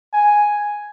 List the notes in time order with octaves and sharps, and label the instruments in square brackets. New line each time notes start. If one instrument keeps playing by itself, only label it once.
[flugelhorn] G#5